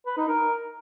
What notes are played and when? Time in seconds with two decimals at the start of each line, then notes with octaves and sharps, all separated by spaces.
0.06 B4
0.17 D#4
0.28 A#4